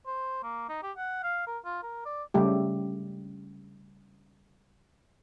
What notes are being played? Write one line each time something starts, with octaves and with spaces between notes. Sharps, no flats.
C5
A#3
D#4
G4
F#5
F5
A#4
F4
A#4
D5
C#3 G3 A3 G4